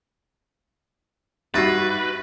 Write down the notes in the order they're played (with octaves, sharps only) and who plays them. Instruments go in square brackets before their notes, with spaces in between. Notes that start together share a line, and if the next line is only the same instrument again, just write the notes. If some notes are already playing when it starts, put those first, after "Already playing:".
[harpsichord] G2 E4 [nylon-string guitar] D#4 F#4 [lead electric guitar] B4 [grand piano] A6 A#6 C7